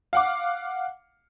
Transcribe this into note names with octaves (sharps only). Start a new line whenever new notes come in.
F5 F#5 D6